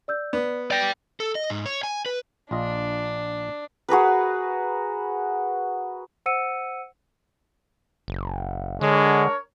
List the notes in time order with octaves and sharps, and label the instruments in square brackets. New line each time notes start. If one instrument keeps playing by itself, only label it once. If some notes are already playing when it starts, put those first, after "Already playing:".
[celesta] D5 E6 G6
[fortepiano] B3 [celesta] D5
[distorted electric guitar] D5 G5 [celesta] A#6 F7
[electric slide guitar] A4
D#5
G#2
C#5
G#5
B4
[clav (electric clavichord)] A#1 F4 D#5 [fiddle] D4
[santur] F#4 G#4 A#4 B4
[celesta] C5 F#5 E6 C#7 D#7
[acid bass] F#1
[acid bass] D3 [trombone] G#3 [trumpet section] D4 A#4 C#5